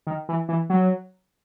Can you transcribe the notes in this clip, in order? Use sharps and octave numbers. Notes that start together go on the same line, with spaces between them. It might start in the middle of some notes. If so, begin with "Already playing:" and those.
D#3
E3
E3
F#3